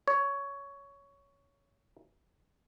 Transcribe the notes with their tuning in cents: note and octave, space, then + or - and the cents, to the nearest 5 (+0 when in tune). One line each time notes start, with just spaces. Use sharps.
C#5 +10